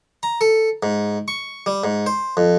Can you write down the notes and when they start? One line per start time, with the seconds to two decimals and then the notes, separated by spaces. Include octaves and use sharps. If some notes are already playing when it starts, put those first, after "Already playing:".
0.23 A#5
0.41 A4
0.83 G#2
1.28 C#6
1.66 G3
1.84 G#2
2.06 C5
2.37 F2